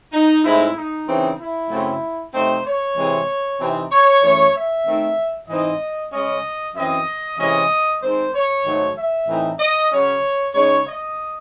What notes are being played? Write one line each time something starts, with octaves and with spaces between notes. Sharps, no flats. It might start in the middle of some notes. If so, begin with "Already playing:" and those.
D#4
A2 G#3 C4 D#4 E4
D#4
C#3 E3 C4
E4
F#2 C#3 F#3 A3 C4
C3 F#3 A3 C4 D#4 C5
C#5
C3 E3 G#3 C4
C3 E3 C4 D#4
C#5
F#2 E3 A3 C#5
E5
D#3 A3 C4
G#2 E3 C4 D#4 D#5
C#3 G#3 C#4 D#5
F#2 E3 C4 D#5
C3 E3 G#3 C#4 D#5
D#3 G#3 C4 C5
C#5
G#2 D#3 F#3 A3
E5
A2 E3 C4 D#4
D#5
C#3 F#3 C#4 C#5
C#3 G#3 D#4 C#5
D#5